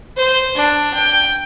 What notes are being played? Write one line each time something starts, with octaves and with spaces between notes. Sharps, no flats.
C5
D4
G5